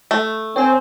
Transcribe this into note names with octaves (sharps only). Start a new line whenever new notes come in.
A3
C4 C#5 G#5